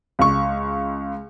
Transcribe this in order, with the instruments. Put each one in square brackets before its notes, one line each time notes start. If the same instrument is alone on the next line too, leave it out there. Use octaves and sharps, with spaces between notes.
[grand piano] C#2 C#6